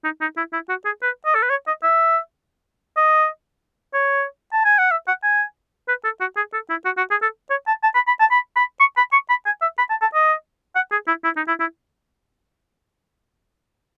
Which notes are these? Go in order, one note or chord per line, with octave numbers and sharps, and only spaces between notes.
D#4
D#4
E4
E4
F#4
G#4
B4
D#5
A4
B4
C#5
D#5
E5
D#5
C#5
A5
G#5
F#5
E5
F#5
G#5
B4
A4
F#4
G#4
A4
E4
F#4
F#4
G#4
A4
C#5
A5
A5
B5
B5
A5
B5
B5
C#6
B5
C#6
B5
G#5
E5
B5
A5
A5
D#5
F#5
G#4
E4
E4
D#4
E4
E4